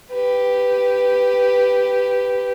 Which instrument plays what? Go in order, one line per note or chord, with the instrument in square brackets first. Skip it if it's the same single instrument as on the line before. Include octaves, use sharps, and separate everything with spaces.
[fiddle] G4 B4